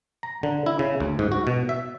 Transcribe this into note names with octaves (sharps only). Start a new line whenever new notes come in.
A#5
D3
E4
C#3
D2
G#2
F#4
B2
E5